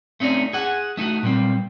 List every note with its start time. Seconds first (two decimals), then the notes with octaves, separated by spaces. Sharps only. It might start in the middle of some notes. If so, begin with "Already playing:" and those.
0.20 A3 C4 C#4 D#4 D5
0.53 G#4 F#5
0.97 A3 D#4 E4 F#4
1.23 A#2 G3 C4